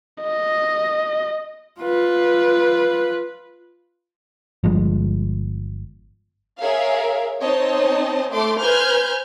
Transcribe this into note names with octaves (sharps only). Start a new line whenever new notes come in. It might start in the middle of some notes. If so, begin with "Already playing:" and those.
D#5
F4 B4
G1 G2 F3 G#3
G#4 A#4 C#5 E5 F5
C4 D#4 C5 C#5 D#5 A5
A3 C6 D6
B4 C5 G#5 F6 G6 G#6